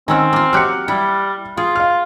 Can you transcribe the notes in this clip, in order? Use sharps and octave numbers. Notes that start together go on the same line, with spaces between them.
D#3 C4 C#4 F#5 G#5 E6
A#3 F4
F#3 G4 F6 F#6 C#7
G3 E4
F4 G#4
F5 F6